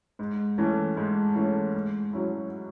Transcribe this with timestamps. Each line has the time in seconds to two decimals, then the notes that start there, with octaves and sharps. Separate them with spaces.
0.19 G#2
0.58 E3 A3 C#4
0.97 G#2
1.35 E3 A3 C#4
1.74 G#2
2.13 F#3 C#4 E4